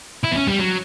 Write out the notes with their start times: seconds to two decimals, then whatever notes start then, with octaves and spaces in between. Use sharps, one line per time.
0.24 E4
0.32 B3
0.36 C#4
0.47 G3
0.59 F#3